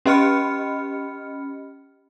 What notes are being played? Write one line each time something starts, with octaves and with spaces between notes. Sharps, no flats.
C#4 G4 D#5 B5 F6 C#7